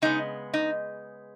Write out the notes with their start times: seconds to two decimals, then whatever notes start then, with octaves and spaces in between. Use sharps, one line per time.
0.02 C#3 G#3 B3 D#4
0.54 D#4